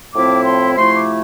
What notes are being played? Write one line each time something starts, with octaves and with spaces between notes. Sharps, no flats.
A2 F3 C4 E4 D6
C6
C3 F3 A3 E4 C6
D6